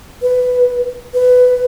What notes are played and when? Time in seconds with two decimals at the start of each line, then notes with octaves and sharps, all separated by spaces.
0.22 B4
1.14 B4